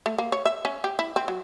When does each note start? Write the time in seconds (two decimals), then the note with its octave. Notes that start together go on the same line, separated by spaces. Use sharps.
0.06 A3
0.18 A#3
0.32 C#5
0.45 E5
0.65 C#4
0.84 G4
0.99 E4
1.16 C4
1.28 F#3